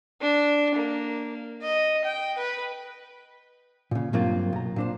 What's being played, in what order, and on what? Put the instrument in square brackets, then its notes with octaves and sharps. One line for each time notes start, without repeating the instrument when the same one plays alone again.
[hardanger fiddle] D4
A#3
D#5
G5
B4
[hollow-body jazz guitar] A#2 C#3
G2 F#3 A#3 C4 F4
B1 A#5
A#2 D4 C5